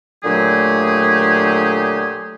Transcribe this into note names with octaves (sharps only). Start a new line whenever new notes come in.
A#2 D3 F#3 A3 G4 G#4